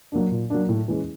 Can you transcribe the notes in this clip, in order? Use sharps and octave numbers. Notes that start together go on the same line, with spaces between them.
F#3 A#3 D4
A#2
F#3 A#3 D4
A2
E3 G#3 C#4